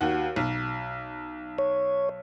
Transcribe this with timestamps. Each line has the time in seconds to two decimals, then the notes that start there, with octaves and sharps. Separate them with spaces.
0.01 D#2 F#4
0.36 B1
1.59 C#5